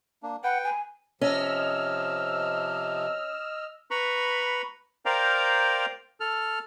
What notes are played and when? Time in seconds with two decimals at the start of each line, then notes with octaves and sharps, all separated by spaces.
0.23 A#3 D4
0.44 B4 F#5 G5
0.64 G#5
1.21 C3 F3 C#4 D#5 E6 F6
3.91 B4 A#5 B5 C#6
5.06 A#4 C5 D5 F5 G5 A#5
6.20 A4 F6